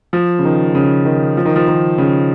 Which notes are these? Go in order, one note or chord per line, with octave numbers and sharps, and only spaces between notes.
F3
C#3
D#3
C#3
D#3
F3
D#3
F3
D#3
C#3